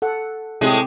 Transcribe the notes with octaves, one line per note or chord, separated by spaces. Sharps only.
A4 F#5
A2 C3 G#3 C4 G4 G#4